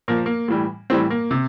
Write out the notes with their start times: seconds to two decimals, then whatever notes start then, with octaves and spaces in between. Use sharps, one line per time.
0.08 A#2 F3 A#3
0.26 A#3
0.48 A2 E3 G3
0.90 A2 E3 G3 C4
1.10 A#3
1.31 C3